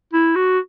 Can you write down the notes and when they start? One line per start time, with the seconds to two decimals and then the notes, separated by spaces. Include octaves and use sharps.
0.13 E4
0.35 F#4